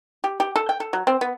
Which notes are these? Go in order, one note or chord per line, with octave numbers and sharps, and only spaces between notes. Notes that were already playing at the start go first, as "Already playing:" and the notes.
G4
G4
A4
G5
A4
F#3
C4
B3